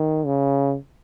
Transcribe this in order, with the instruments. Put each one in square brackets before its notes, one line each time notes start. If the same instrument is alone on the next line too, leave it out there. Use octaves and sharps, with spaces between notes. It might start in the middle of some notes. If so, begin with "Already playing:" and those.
Already playing: [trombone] D#3
C#3